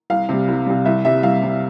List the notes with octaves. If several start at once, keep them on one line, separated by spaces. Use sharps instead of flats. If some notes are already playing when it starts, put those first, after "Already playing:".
C2 F5
C3 G3
C2
C3 G3
C2 E5
C3 G3 E5
C2 F5
C3 G3